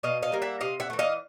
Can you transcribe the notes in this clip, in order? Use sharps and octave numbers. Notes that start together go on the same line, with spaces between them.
B2 D#5 F5
D#5 F5
G3 A#3
E5 F#5
C3 D#5 F5
E5 F#5
E3 A3
D#5 F5